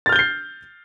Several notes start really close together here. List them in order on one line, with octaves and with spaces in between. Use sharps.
A6 F6 G6 G7 C7